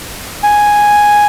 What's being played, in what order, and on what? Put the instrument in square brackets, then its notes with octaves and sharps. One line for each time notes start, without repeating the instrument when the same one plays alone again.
[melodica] G#5